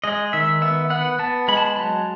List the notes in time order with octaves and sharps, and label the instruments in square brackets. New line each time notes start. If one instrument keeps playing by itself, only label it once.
[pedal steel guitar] G#3 D#5
D#3 E5
B3 E5
B3 F#5
B3 A5
G#3 B5
A5
B5
F#3 A5